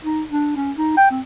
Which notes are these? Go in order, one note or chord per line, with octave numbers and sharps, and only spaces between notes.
D#4
D4
C#4
D#4
G5
C4